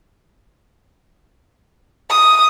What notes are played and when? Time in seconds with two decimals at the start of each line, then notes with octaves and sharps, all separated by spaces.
2.10 D#6